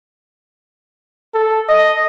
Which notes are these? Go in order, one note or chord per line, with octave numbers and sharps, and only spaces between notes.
A4
D#5